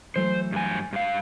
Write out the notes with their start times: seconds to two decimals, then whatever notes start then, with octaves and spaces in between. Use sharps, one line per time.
0.16 E3 F#3 A3 C5
0.52 G2 G#5
0.93 G2 F5